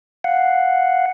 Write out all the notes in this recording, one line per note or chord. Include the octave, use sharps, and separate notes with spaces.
F5 F#5